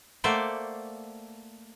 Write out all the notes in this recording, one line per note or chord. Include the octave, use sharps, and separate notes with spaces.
A3 A#3 C5 D5 F#5